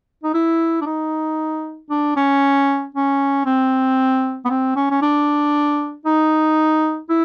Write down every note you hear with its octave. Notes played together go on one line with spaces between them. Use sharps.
D#4
E4
D4
D#4
D4
C#4
C#4
C4
B3
C4
C#4
C#4
D4
D#4
E4